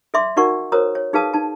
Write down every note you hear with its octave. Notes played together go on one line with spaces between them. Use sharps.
A4 D5 E5 C6 D6
D#4 F#4 A#4 D5 F#5 C#6
F#4 A#4 C5 C#5 A#5 D#6
C#5
D#4 G#4 B4 F5 A5 D#6
D#4 A5